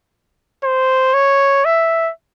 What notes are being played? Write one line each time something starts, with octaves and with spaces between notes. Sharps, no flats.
C5
C#5
E5